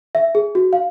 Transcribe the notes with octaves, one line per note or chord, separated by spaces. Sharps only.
E5
G#4
F#4
F5